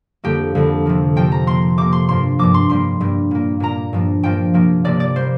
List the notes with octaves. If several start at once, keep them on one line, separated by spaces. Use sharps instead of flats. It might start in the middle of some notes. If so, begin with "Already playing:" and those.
F2 D3 G3 A#3 G4
F2 D3 G3 A#3
C3 F3 A#3
C3 F3 A#3 G5
A#5
C3 A#3 C6
C3 A#3 D6
C6
G2 F3 A#3 C6
G2 F3 A#3 D6
C6
G2 G3 A#3 C6
G2 G3 A#3
A#2 A#3
A#2 A#3 A#5
G2 F3 A#3
G2 F3 A#3 G5
C3 F3 A#3
C3 F3 A#3 D5
D5
G3 A#3 C5